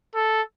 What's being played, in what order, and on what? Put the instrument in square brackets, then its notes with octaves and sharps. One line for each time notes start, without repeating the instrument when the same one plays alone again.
[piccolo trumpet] A4